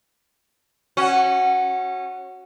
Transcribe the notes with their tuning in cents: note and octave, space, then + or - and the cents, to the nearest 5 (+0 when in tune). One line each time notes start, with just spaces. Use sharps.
C#4 -20 F#4 +0